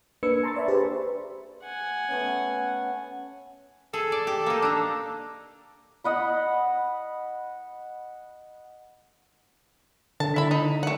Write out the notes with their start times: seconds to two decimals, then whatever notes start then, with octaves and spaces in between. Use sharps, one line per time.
0.23 A#3 D4 B4 E6 G#6 C#7
0.43 A5 A#5 C6 C#6 E6 A6
0.56 D5 E5 B5
0.68 D4 G4 G#4 B4 C5
1.64 F#5 G#5
2.08 A3 B3 C#4
3.94 G#4 A4
4.12 D5
4.27 G4
4.46 A#3 D#4
4.62 D4 A#5
6.04 D#5 F#5 B5
10.20 D3 A5
10.36 E4 B5
10.51 D#4
10.83 A3 F#5